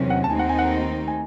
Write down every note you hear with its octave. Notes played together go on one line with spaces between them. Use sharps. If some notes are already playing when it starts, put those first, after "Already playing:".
Already playing: E2 C3 D#3 F#3 C#4
F#5
A5
D#2 D#3 A3 C4 D#4 G#5
F#5
G#5
F#5
G#5